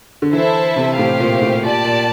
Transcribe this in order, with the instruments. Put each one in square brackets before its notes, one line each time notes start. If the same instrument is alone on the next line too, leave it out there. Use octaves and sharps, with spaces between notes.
[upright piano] D3
[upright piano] E3 [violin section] E4 A4 C5 E5 A5
[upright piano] C3
[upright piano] A2 [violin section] G4 C5 F5
[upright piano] A#2
A2
[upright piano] A#2 [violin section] G4 D5 A5
[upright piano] A#2